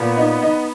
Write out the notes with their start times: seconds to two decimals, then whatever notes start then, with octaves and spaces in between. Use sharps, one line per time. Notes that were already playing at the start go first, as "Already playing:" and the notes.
Already playing: A#2 B3
0.17 D#4
0.42 D#4